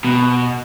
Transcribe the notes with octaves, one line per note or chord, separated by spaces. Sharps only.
B2